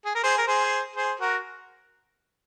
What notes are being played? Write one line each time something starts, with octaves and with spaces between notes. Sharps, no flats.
G#4
A#4
G#4 C5
A#4
G#4 C5
G#4 C5
F#4 A#4